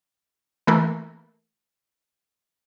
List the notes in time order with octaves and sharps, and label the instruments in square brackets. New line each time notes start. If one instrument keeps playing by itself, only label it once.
[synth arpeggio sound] E3 A3 A#3